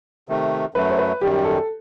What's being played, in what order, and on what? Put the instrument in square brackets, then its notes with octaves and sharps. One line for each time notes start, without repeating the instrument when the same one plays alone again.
[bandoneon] C3 D#3 A3
[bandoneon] F#2 F#3 A3 [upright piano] B4
[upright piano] C5
B4
[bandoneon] F#2 D#3 G3 [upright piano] G4
[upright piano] A4